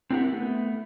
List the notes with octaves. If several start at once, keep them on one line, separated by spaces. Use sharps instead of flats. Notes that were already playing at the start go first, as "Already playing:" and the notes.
C4 D4 E4 G4 A#4 F#5
A3 B3